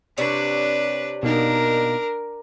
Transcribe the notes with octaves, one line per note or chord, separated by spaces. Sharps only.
C3 D4 B4 C#5 D5
B2 A#3 D4 D#4 A#4